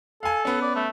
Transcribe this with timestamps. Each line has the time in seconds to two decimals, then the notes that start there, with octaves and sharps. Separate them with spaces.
0.23 A4 F5 G#5
0.45 B3 C#4
0.62 D5
0.76 A3